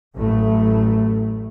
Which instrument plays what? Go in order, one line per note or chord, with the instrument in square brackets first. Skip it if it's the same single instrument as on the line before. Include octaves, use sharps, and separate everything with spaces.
[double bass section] A1 F#2 A2 A3